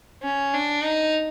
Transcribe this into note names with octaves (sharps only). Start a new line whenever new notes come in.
C#4
D4
D#4